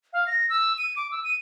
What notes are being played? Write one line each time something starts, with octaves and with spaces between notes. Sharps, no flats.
F5
A#6
E6
D#7
D6
E6
D#7